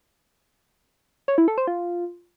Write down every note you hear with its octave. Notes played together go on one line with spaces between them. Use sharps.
C#5
E4
A4
C5
F4